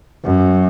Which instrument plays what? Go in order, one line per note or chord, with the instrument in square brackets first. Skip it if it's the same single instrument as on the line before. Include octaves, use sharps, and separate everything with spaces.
[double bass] F#2